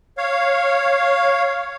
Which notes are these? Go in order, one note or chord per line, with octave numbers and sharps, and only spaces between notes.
C#5 F5